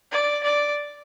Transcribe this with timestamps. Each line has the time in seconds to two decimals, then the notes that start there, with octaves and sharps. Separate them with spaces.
0.12 D5
0.43 D5